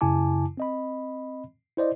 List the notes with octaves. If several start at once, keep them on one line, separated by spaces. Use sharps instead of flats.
F#2 C#3 E4 G#5 A5 D6
C4 D#5 B5
E4 C5 D5 D#5